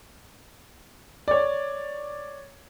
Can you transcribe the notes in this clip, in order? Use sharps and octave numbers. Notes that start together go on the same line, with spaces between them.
C#5 D5